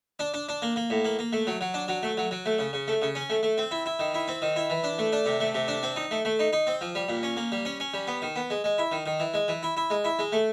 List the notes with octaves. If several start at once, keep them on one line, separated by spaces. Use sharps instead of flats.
D4
D4
D4
A#3
A#3
A2
A#3
A#3
A3
F#3
F#3
D4
F#3
A3
F#3
F#3
A3
C#3
C#3
A3
C#3
C#4
A3
A3
C4
E4
E4
D#3
E4
C4
D#3
E4
E3
D4
A3
D4
C3
A3
C3
D4
C4
D#4
A3
A3
D#4
D#4
C4
F3
G3
A#2
C#4
A#3
G3
C#4
C#4
G3
B3
D#3
B3
G#3
G#3
E4
D#3
D#3
E3
G#3
E3
E4
E4
G#3
E4
G#3
A3